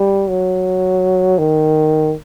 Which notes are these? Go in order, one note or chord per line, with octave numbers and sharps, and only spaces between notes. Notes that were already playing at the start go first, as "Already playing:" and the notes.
Already playing: G3
F#3
D#3